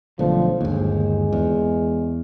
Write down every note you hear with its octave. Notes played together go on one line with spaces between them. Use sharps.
B1 D3 F3 A3
G1 D#2 G#3
E2